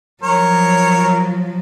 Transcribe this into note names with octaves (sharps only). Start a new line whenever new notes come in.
F3 F#3 A#4 C#5